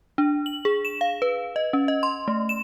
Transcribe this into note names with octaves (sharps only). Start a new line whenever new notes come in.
D4
F#7
G#4
E7
F5
B4
D#5
C#4
D#5
C6
A3
E7